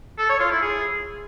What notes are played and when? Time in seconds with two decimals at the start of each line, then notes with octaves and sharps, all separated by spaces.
0.18 A4
0.29 C#5
0.40 F4
0.51 E4
0.62 G#4